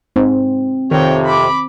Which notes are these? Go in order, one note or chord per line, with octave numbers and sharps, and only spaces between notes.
G#2 C4
F2 C3 D#3 C#5 G5
B5 D6